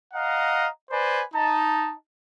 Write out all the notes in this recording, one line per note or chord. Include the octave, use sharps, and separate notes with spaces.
D#5 F5 F#5 A#5
B4 C5 D5 G#5
D#4 A5